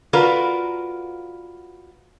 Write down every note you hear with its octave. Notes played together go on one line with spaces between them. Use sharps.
F4 F#4 A#4 B4 D5